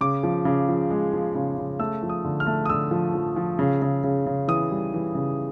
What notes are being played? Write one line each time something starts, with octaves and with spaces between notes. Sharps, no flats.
C#3 D6
F3
C#3
F3
G#3
F3
C#3
C#3
A3 E6
F3
D#6
D3
F6
A3
D#6
D3 E6
F3
F3
F3
C#3
C#3
C#3
C#3
E3 D#6
G3
E3
C#3